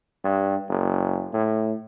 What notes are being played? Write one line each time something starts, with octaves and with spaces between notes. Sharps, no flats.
G2
F#1
A2